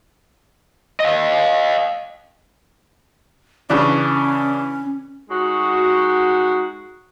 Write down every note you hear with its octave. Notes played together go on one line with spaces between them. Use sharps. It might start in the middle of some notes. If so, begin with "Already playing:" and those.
D#5 F5
C#3 E3 C#4 D4
G#3 D#4 F#4